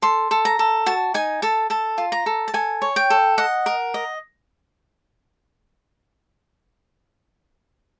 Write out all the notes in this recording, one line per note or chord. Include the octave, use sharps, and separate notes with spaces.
A4 C6
A4
A#5
A4
F#4 A5
D#4 G#5
A4 A5
A4 A5
F4
A#5
A4
A5
A4 G#5
C#5
G5
A4
D#5 F#5
A#4
D#5